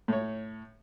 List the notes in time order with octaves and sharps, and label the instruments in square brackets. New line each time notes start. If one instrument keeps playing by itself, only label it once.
[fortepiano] A2 C#5